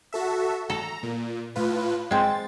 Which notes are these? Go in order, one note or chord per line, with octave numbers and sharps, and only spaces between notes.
F#4 A4 E5
A4 A#5
A#2
A2 F4 B4
G#3 C4 A6